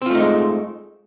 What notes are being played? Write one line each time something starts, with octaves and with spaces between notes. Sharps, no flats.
G#3 A3 C4 D#4 F4